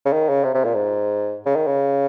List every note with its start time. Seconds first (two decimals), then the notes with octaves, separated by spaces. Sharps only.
0.05 C#3
0.13 D#3
0.29 C#3
0.44 C3
0.54 C3
0.64 A#2
0.75 G#2
1.46 C#3
1.56 D#3
1.67 C#3